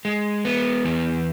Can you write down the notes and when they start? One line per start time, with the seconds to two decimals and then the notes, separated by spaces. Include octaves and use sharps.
0.05 G#3
0.45 B3
0.85 E2